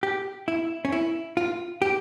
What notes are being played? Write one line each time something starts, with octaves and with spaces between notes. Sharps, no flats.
G4
E4
C#4
E4
F4
G4